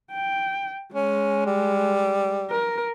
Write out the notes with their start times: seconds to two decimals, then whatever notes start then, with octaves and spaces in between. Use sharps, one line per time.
0.12 G5
0.94 G#3 C#4
1.46 G3
2.51 A#4